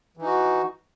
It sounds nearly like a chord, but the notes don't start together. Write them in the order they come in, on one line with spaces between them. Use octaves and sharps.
E3 D#4 F#4